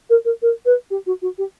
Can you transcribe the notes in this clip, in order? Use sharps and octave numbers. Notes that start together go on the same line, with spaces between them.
A#4
A#4
A#4
B4
G4
F#4
F#4
G4